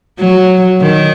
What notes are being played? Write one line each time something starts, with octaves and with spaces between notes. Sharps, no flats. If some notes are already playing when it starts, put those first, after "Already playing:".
F#3
D#3